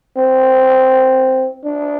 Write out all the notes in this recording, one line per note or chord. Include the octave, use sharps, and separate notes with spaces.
C4
D4